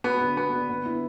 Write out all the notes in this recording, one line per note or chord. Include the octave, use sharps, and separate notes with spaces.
B3 F#4
D3
B3 F#4
D3
B3
E4